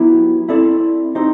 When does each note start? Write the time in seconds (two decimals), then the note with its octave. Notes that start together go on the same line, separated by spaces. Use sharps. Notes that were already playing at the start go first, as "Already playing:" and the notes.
Already playing: F#3 B3 E4 G4
0.49 C4 E4 A4 D5
1.15 C4 D#4 G4 C5